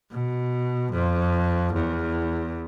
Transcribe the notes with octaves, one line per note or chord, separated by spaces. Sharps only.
B2
F2
E2